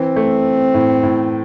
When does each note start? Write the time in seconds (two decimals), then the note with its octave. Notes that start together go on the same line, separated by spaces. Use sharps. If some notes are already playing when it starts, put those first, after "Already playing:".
Already playing: E3 C4
0.16 A3
0.74 A2
1.03 A2